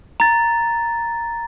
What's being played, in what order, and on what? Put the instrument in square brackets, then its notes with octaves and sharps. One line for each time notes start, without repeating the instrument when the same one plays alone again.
[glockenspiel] A#5 A6